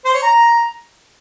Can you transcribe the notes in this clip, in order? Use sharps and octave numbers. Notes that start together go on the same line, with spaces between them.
C5
C#5
A#5